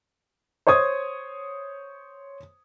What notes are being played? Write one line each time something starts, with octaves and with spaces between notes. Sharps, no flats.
C5 C#5 C#6 D#6 G#6